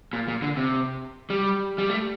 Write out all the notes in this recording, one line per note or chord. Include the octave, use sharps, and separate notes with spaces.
A#2
A#2
D3
C3
G3
G3
A3